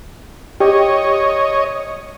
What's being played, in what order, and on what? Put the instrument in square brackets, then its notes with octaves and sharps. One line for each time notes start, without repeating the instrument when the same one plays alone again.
[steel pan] G4 [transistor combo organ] C#5 D#5